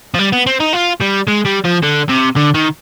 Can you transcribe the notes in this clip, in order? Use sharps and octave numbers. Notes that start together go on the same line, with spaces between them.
F3
G3
B3
C4
D#4
F4
G3
G#3
G3
F3
D3
C3
D3
D#3